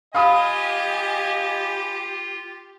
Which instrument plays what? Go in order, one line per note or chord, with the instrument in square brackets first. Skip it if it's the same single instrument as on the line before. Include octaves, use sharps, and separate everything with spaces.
[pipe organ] F4 [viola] G4 [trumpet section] D#5 G#5 [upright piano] F5 B5 D#6